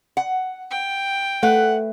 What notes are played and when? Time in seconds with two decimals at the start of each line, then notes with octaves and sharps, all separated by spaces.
0.17 F#5
0.71 G5
1.43 A3 B4 F#5